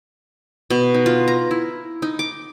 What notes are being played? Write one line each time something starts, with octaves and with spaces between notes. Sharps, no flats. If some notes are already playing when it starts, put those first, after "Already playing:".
B2
D#4
F4
A#5
E4
D#4
D6